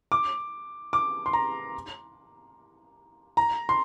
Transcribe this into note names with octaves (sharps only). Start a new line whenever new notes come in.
D6
D6
C6
A#5
A#5
C6